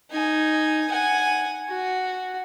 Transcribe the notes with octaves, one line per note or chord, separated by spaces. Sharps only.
D#4 G#5
F#5 G#5
F#4